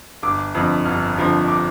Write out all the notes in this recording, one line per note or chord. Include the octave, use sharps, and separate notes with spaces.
G1 D6
F2 D3 F3
G1 F6
F2 D3 F3
D6